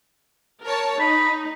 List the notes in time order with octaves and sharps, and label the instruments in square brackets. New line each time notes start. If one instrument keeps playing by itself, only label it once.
[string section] A#4 C#5 A5
[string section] D#4 [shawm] B5